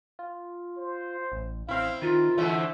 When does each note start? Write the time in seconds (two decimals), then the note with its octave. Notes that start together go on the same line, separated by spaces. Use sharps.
0.19 F4
0.77 C5
1.32 A1
1.69 A1 C4 E4 F5
2.02 D#3 F4 A#4
2.38 G#2 D3 E3 A3 E5